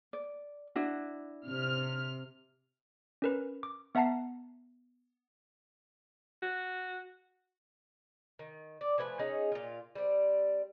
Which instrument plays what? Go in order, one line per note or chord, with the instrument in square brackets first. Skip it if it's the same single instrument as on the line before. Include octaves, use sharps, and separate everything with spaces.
[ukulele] D5
D4 E4 F#4
[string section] C3 F6
[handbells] C#4 A#4 B4
D6
B3 E5 F#5 A5 A#5 C7
[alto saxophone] F#4
[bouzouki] D#3
D5
F3 A3 B4 G#5
C#4 D#4 G#4
A#2 F4
G3 C4